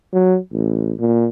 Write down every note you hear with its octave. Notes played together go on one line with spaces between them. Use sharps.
F#3
A1
A#2